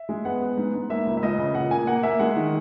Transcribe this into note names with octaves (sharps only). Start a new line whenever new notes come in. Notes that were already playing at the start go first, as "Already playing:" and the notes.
Already playing: E5
G#3
B3 F#5
B3
G#2
G#2
A#3 E5
C#2
E5
C#2 D#5
C#3
A#2 F#5
A#3 G#5
A#3 F#5
A#3 E5
G#3 F#5
D#3